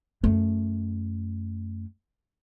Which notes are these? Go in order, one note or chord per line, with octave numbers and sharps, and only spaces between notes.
F#2 A3